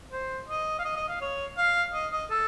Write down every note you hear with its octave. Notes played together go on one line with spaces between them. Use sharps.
C5
D#5
F5
D#5
D#5
F5
C#5
F5
D#5
D#5
A4